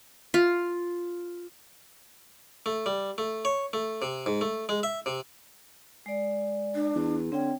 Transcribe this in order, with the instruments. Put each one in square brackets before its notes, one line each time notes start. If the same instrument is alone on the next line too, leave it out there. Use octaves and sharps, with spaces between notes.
[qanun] F4
[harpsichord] A3
G3
A3
C#5
A3
C3
G#2
A3
G#3
E5
C3
[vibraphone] G#3 D5
[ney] D4
[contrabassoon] E2
[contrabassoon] D3 [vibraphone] C4 G5 [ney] C#5